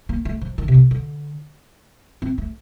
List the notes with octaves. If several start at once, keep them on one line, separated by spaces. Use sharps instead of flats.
A#3
A3
F3
D#3
C3
D3
D3
C4
A3